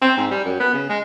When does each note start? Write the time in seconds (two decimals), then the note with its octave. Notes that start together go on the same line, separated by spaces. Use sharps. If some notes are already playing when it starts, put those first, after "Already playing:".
0.02 C4
0.17 G#2
0.31 G3
0.45 F#2
0.60 B3
0.74 C#3
0.89 G#3